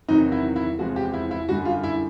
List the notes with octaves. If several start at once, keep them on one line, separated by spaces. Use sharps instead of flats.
E2 C3 D#3 F#3 D#4
E4
E4
E2 C3 F3 G#3 F#4
G4
E4
E4
F#2 D3 G3 F#4
F4
E4